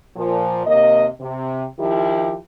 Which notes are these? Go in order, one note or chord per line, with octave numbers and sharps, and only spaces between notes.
A#2 F3
D#2 C3 A#3 D#5
C3
D#3 F3 E4 G4